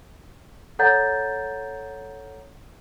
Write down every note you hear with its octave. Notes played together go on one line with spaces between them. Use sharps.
A4 C#5 F#5 A#5 G6 A6